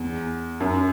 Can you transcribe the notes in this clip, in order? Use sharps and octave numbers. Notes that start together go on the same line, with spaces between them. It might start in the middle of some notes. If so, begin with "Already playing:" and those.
Already playing: E2
F#2